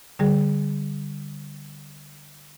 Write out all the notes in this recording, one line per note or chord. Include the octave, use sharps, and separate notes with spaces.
D3 G3 G#4